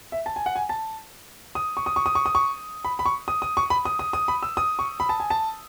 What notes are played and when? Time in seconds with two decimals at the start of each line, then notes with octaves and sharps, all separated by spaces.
0.12 E5
0.26 A5
0.36 G#5
0.46 F#5
0.56 G#5
0.69 A5
1.55 D#6
1.77 C#6
1.86 D#6
1.96 C#6
2.06 D#6
2.15 C#6
2.26 D#6
2.35 C#6
2.85 B5
2.99 B5
3.06 C#6
3.28 D#6
3.42 D#6
3.57 C#6
3.70 B5
3.85 D#6
3.99 D#6
4.13 D#6
4.28 B5
4.43 E6
4.57 D#6
4.79 C#6
5.00 B5
5.09 A5
5.20 G#5
5.30 A5